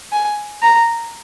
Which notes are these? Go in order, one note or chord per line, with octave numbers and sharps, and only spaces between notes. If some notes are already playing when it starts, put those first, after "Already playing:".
G#5
A#5